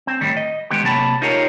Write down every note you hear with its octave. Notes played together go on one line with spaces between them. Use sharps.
C4
A2 D#3 G3
D#5
D#3 G#3 B3 G4
C3 F#3 A#3 A5 B5
D#4 F4 G4 G#4 A#4 C#5